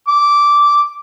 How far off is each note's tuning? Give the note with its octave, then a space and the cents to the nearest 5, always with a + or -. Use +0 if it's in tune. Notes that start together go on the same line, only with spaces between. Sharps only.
D6 -10